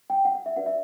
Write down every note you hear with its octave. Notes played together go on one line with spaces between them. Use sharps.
G5
F#5
F#5
E5
D4 F#4 B4 D5 F#5
E5